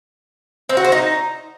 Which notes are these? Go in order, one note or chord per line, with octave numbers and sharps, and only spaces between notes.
C4
F#4
C5
D#4